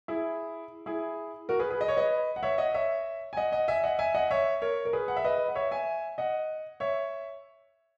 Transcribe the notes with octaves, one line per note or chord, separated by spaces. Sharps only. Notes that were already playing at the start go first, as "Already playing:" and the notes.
E4 G#4
E4 G#4
F#4 A#4
G#4 B4
G#4 B4
D#5
C#5
B4 D#5
F#5
C#5 E5
D#5 F#5
C#5 E5
G#5
D#5 F#5
D#5 F#5
E5 G#5
D#5 F#5
E5 G#5
D#5 F#5
C#5 E5
A#4 C#5
A#4
G#4 B4
F#5
E5
B4 D#5
F#5
C#5 E5
E5 G#5
D#5 F#5
C#5 E5